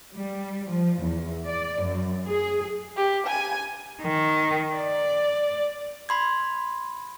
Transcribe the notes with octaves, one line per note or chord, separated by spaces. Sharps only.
G3
F3
E2
D5
F#2
G#4
G4
G#5
D#3
D5
B5 C6 G#6